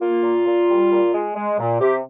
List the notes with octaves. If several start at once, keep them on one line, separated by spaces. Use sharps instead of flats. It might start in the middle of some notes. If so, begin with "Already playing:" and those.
A#3 F4
A#2
A#2
G3
A#2
G#3
G#3
A#2
C3 G4